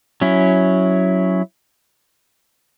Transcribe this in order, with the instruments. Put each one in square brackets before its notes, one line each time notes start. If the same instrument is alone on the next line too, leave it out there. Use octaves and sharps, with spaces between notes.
[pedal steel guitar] F#3 C#4 E4